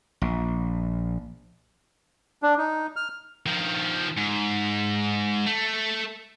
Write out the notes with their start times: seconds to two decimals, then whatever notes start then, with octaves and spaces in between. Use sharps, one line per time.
0.22 A#1
2.43 D4
2.58 D#4
2.96 F6
3.46 D#3 F3
4.17 G#2
5.46 A3